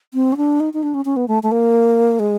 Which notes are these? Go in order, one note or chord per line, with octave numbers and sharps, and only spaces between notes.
C4
C#4
D4
D#4
D#4
D4
C#4
C#4
B3
A3
A3
A#3
G#3